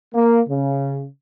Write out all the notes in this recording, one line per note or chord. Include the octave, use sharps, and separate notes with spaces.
A#3
C#3